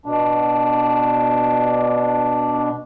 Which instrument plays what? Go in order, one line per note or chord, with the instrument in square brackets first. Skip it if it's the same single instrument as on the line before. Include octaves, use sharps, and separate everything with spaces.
[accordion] B2 D4